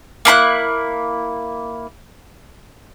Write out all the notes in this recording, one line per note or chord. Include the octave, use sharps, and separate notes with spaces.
A#3 E4 B5 F#6